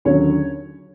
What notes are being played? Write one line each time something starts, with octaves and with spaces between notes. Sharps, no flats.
D#2 D3 F#3 C#4 C#5